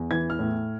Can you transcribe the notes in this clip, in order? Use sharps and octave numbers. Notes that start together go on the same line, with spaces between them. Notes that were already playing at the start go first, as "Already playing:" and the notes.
Already playing: E2
E3 G#6
F6
A2